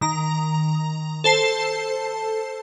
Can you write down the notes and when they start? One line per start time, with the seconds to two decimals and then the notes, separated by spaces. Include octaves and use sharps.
0.01 D#3 A#5
1.24 A4 C5 A5 C7